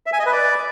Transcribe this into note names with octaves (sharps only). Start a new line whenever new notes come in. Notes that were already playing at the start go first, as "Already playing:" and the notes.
E5
G#5
D#5
B4
D5